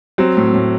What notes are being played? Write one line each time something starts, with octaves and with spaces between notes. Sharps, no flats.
F#3 C4
A2
A2